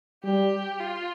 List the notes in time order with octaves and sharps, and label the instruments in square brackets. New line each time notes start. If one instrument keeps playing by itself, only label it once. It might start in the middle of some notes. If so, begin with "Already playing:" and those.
[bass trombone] G3 [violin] G4
[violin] F4